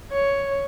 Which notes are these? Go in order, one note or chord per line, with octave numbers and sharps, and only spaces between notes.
C#5